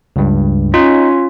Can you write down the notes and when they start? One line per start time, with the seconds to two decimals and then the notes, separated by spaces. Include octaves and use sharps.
0.16 C#2 G2
0.74 C#4 D#4 F4